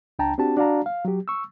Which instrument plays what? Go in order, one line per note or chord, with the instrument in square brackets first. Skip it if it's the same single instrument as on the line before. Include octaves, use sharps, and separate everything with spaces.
[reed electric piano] C#2 D4 G5 A5 A#5
C4 D4 F#4 G4 A5
D4 F#4 D5 F5 A5 A#5
F5
F#3 G4
C#6 E6